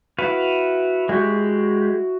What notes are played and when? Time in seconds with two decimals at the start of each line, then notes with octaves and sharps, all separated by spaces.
0.18 E4 F#4 B4 F5 F#5 B5
1.09 G#3 F#4 G4